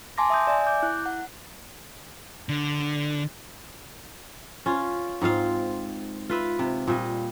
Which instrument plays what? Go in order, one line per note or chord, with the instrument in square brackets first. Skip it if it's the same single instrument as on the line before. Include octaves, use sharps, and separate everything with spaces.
[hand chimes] G#5 A5 C6 D6 A#6
E5 D#6 G6
D5 E5 G#5
D6 G6
E4 F#6
F#5
[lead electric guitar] D3
[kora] C#4 F4
G#2 C4 F4 F5
F4 B4 E5
C3
A#2 G3 D#5